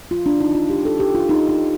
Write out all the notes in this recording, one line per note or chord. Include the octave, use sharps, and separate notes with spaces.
F4
D4
D#4
F4
G4
A4
G4
F4
D#4
D#4